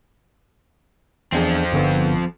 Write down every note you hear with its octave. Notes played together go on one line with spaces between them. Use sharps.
E2 F3 C4 D4 G#4
G1 D3 B3